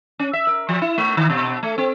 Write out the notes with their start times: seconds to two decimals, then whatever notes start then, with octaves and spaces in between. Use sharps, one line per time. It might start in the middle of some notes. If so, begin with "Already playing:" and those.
0.19 C#4
0.33 E5
0.47 A#4
0.69 F3
0.82 E4
0.98 A3
1.17 D#3
1.30 B2
1.63 A3
1.78 C4